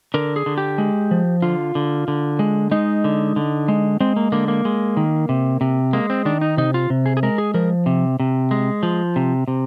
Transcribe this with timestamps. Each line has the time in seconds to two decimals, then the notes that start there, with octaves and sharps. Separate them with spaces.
0.14 D3 A#4
0.36 G#4
0.46 D3
0.58 G4
0.78 G#3
1.11 F3
1.42 D3 F4
1.75 D3
2.08 D3
2.39 G#3
2.71 G#3 D#4
3.04 D3
3.36 D3
3.68 G#3
4.00 G#3 C4
4.16 A#3
4.32 D3 A#3
4.48 A#3
4.65 G#3
4.97 D#3
5.29 C3
5.61 C3
5.93 G#3 A#3
6.10 C4
6.25 D#3 D4
6.41 D#4
6.57 C3 D#4
6.74 F4
6.90 C3
7.06 G#4
7.17 G#4
7.23 G#3 A#4
7.38 G#4
7.54 F3 A#4
7.86 C3
8.20 C3
8.51 G#3
8.83 F3
9.16 C3
9.48 C3